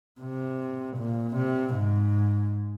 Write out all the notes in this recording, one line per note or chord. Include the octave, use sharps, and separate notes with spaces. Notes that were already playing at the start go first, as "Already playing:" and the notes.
C3
A#2
C3
G#2